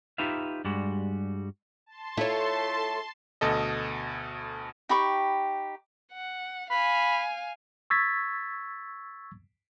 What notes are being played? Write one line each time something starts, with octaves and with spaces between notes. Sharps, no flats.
D#4 F4 G4 B4 E5 F5
G2 G3 G#3 F#4
A5 C6
A3 E4 F4 A4 C#5
D2 B2 A4 D#5
D#4 G4 B5 C#6
F#5
F5 G#5 B5
C#6 E6 G#6 A6 B6